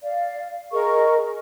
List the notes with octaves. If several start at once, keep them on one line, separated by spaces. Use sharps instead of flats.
D5 F5
G#4 A#4 D#5 C#6